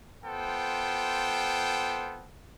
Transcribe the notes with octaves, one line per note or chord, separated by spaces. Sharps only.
B3 F4 A4 C5 G5